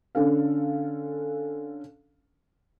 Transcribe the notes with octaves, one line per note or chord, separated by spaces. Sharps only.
D3 C#4 D4 A4 F5